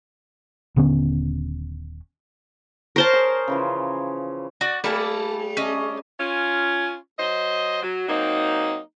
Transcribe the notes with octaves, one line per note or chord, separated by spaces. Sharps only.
D#1 D3 B3 C#4
A#4 C5 C#5 A5
G#4
C#3 E3 F3
F#4 D5
G3 G#3 A#3 E4 G#4 A5
C#4 D4 D#5 E5
C#4 F4
F#3 C5 D#5
F#3
F#3 A#3 C4 D#4